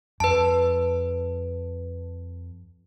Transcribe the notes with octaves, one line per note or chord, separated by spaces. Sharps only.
F2 B4 A5